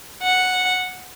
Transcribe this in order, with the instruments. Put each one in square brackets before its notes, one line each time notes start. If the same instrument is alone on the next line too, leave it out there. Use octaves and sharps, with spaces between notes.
[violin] F#5